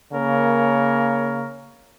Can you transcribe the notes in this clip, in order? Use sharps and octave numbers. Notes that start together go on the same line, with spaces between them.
C#3 A#3 A#4 C#5